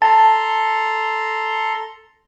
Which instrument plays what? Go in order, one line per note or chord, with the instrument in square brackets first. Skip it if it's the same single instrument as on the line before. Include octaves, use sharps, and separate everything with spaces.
[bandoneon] A4 A#5 C6 [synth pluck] A5